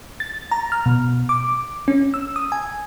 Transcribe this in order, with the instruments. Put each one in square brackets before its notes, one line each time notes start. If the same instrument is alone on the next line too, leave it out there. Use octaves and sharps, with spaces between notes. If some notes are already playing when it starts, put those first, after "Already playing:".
[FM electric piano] A6
A#5
F6
B2
D6
C#4
E6
D#6
G#5